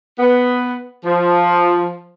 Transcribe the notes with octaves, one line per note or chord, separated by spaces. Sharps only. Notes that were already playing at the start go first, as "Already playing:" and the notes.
B3
F3